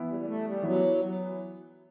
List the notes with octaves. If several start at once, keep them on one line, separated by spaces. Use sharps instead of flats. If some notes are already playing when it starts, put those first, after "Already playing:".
Already playing: E3 B3 E4
G3
G3
A3
G3
E3 F#3 B3 E4